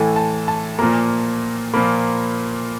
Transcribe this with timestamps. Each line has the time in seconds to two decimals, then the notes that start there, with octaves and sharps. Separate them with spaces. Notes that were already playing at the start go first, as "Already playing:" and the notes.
Already playing: A2 E3 A3 G#5
0.16 A5
0.48 A5
0.79 A#2 F3 A#3 A#5
1.74 A#2 F3 A#3 B5